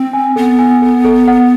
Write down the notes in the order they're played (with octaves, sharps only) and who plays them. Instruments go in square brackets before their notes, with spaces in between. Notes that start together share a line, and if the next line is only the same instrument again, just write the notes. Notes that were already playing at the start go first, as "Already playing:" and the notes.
Already playing: [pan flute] C4
[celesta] G#5
[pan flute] B3 [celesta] A4
[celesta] G#5
A4
A4
F#5